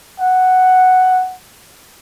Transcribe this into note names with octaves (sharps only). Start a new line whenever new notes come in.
F#5